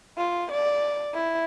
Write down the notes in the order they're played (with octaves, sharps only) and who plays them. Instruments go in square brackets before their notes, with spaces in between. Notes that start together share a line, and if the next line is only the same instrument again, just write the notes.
[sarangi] F4
D5
E4